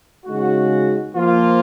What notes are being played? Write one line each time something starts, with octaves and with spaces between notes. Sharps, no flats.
C#3 G#3 D#4 F#4
F3 A#3 F4